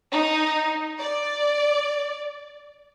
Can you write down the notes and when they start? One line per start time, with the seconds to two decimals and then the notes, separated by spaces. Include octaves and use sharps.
0.12 D#4
1.00 D5